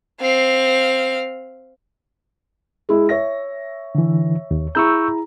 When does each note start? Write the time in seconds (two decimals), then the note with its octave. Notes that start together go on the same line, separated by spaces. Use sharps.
0.21 C4 F5
2.89 G#3 E4
3.09 C#5 E5 A#6
3.95 D3 E3
4.51 D#2
4.75 E4 G#4 A#5 C#6 E6 G6